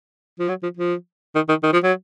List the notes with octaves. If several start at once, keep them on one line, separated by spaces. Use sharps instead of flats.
F3
F#3
F3
F3
D#3
D#3
D#3
F3
F#3